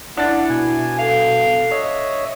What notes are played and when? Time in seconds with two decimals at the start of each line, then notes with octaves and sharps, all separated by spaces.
0.17 D4 E4 F#5 A6
0.50 B2 G#5
0.99 A4 F5
1.71 C#5 D#5 E5